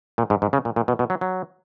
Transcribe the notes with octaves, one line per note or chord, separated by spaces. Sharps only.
A#2
G#2
G#2
C#3
A#2
A#2
B2
B2
F#3
F#3